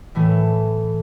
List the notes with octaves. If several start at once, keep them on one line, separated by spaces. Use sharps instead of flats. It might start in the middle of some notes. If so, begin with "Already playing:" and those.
A2 E3 A3